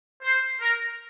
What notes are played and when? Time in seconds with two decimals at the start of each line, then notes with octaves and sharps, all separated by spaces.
0.23 C5
0.60 A#4